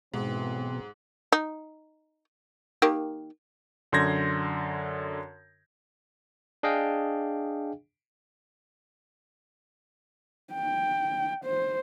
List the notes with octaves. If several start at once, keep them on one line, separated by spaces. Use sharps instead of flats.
B1 G#2 B2 E3 C4
D#4
D#3 A#3 G4
F#2 D3 C6 G6 G#6 A#6
D4 G#4 D#5 F5 G5
G5
C5